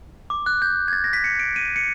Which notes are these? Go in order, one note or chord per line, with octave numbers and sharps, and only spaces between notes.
D6
F#6
G6
G#6
A6
A#6
B6
C#7
D7
D#7
C#7